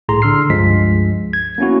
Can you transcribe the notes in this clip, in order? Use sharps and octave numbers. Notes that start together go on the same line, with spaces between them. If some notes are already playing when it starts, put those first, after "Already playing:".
C2 A2 G#4 A#5 C6
D3 D4 C6 E6 F6 C7
C#2 G2 F3 G#3 B6
G#6
A#3 B3 C#4 E4 F#4